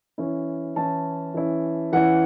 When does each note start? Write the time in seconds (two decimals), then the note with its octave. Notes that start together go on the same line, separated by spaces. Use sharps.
0.18 E3 C#4 E4
0.76 E3 C#4 E4 A5
1.34 E3 C#4 E4
1.92 E3 C#4 E4 F#5